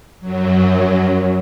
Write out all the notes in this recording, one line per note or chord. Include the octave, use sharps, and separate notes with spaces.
F#2 F#3